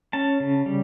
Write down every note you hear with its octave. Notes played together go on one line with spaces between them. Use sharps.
C#4 A5
C#3
G3